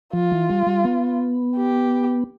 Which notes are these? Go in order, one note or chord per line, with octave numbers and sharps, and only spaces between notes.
F3 F4
E3
G3
G3
B3
G4